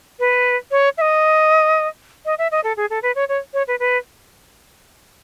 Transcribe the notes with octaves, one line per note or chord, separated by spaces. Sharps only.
B4
C#5
E5
D#5
D#5
E5
D#5
A4
G#4
A4
B4
C#5
C#5
C#5
B4
B4